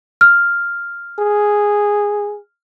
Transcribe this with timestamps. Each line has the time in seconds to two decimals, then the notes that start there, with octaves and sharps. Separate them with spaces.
0.21 F6
1.19 G#4